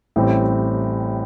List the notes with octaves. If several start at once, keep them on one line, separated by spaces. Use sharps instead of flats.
A1 A2 G3 C4